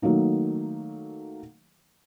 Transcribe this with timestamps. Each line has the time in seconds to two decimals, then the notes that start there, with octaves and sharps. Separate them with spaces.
0.02 D#3 F#3 A3 A#3 D#4